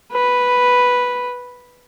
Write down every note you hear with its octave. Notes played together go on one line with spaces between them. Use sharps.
B4